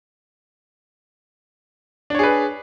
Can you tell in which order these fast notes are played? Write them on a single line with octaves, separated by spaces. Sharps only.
D4 C#5 G#4 B4